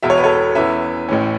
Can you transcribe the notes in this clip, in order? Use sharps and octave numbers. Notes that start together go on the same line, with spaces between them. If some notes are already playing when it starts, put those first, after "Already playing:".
E1 E2 B2 E5
C#5
B4
A4 C#5
E2 E3 C#4 B4 E5
A1 A2 E3 C#4